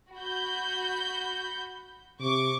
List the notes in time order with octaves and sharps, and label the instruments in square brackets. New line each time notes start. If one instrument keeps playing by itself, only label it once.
[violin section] F#4 B5 G6
[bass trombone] C3 [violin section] C#6 D6